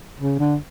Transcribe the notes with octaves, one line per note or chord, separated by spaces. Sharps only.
C#3
D3